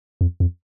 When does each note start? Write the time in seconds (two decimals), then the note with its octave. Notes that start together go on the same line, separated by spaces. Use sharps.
0.21 F2
0.40 F2